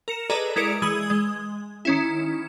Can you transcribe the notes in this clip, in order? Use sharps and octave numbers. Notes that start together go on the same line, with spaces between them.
A#4 C#7 E7
G#4 A4 B4 D5 D#5 A#5
G#3 E4 A#4 D5 C#7 D7
E3 G#3 G#4 D#6 G#6 F#7
G#3
D#3 C#4 E4